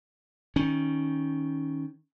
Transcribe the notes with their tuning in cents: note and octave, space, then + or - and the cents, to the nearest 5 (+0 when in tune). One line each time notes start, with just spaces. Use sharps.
D#3 +10 C#4 +0